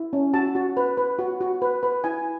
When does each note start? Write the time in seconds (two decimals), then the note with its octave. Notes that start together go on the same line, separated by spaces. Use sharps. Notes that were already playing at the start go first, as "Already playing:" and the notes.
Already playing: E4
0.13 C#4
0.34 F#4 A5
0.55 F#4
0.77 B4
0.97 B4
1.19 F#4
1.41 F#4
1.62 B4
1.83 B4
2.04 E4 G#5